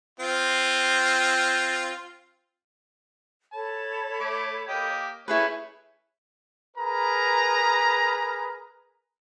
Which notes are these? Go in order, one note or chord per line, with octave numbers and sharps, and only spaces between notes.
C4 F4
A4 C#5 A5 B5
A3 D6
A#3 G4 D#5
A3 C#4 E4 G#4 B4
G#4 A#4 B4 A#5